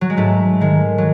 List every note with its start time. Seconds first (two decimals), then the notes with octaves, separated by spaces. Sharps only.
0.01 F#3
0.10 G#3
0.17 G#2 A3
0.61 D#3 G#3
0.98 F#3